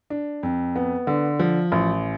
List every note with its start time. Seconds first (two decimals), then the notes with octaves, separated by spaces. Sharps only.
0.10 D4
0.43 F2
0.76 B3
1.07 D3
1.39 F3
1.72 A1